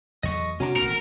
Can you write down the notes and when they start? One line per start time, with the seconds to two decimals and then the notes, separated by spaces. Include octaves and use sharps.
0.23 E2 F#3 A3 D#5 C#6
0.60 C3 A#3 C#4 D4 F#4 A#5
0.76 D#1 A1 A3 C4 A#4